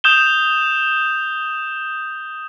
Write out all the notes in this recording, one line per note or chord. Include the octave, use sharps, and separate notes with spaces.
D#6 G6 E7 G7